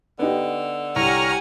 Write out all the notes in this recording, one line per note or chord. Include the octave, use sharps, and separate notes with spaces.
D3 B3 D#4 G4
C2 G4 C#5 F#5 G#5 A#5 F6